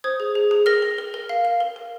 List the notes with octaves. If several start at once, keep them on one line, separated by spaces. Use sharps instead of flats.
C5 D#6 G#6
G#4
G#4
G#4
A#4 F6 A#6
A#4
A#4
A#4
F5
F5
A#4
A#4